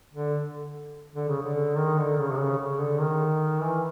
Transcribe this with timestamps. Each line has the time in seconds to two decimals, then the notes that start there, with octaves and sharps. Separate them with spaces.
0.14 D3
1.15 D3
1.28 C#3
1.42 D3
1.77 D#3
1.98 D3
2.18 C#3
2.31 C3
2.38 C#3
2.59 C#3
2.79 D3
3.00 D#3
3.60 E3